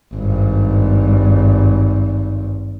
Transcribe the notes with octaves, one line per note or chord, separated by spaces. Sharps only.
G#1 G2